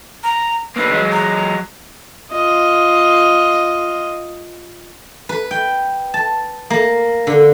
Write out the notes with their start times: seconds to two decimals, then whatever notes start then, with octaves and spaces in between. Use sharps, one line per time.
0.23 A#5
0.76 D3 A#3 B4
0.92 F#3 G#3
1.12 A#5
2.31 F4 D#5
5.29 B4
5.51 G5
6.14 A5
6.70 A#3
7.27 D3